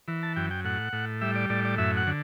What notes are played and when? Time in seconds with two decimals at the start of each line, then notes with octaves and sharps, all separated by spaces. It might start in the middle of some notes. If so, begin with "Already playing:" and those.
0.08 E3
0.23 A5
0.36 F#2 G5
0.51 G5
0.65 A2 F#5
0.93 A2
1.21 G3 E5
1.35 D5
1.50 A2 D5
1.65 D5
1.78 F#2 E5
1.97 F#5
2.07 D3